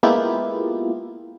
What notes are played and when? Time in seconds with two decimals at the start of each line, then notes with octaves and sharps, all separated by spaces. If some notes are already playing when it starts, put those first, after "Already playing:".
0.03 G#3 A#3 B3 E4 F4 G4